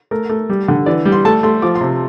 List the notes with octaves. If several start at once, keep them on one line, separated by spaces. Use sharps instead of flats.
A3 A#4
A3
G3
D3
E3 D5
G3
C6
A3 A5
A3 C6
F3 D6
C6
C3